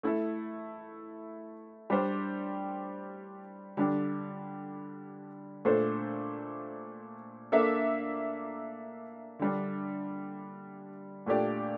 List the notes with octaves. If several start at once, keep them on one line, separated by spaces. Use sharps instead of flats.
A3 E4 A4
G3 D4 G4 C5
D3 G3 D4 G4
A#2 A3 D4 A4 C5
A#3 D4 A4 E5
D3 G3 D4
A#2 A3 D4 G4 D5